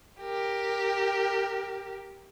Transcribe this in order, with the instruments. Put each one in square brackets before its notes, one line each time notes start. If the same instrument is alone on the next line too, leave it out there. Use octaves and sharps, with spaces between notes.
[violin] G4 A#4